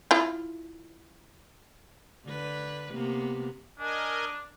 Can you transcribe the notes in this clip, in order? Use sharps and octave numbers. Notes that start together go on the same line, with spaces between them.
E4 F4
D3 B4
C3 A#3 B3
D4 A#4 D#5 G#5